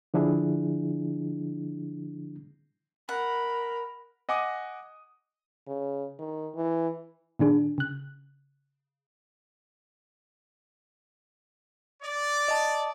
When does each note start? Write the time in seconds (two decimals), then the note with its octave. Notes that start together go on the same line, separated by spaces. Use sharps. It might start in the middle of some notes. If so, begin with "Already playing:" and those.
0.14 D3 F3 D4 E4 G#4
3.09 A#4 F#5 B5
4.29 D#5 F#5 G#5 D6 D#6
5.67 C#3
6.19 D#3
6.55 E3
7.39 A#2 D#3 D4 G#4
7.78 C#3 F#6
12.03 D5
12.48 D#5 A5